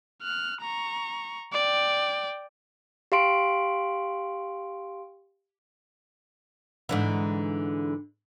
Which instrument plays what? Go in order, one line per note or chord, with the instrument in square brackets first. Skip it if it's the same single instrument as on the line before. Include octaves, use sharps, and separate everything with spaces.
[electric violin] F6 F#6
A#5 C#6
D5 G5
[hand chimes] G4 F5 C6 D7
[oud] G#2 D3 E3